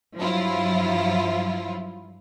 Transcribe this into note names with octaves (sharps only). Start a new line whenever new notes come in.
G2 F3 F#3 E4 F4